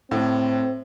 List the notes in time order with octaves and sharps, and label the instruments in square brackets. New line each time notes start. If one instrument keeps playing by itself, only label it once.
[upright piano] A2 [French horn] C4